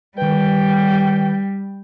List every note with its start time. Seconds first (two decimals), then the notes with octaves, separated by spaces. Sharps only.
0.18 D#3 G3 B4 G5